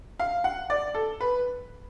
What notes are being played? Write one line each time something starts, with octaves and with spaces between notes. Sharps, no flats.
F5
F#5
D5
A4
B4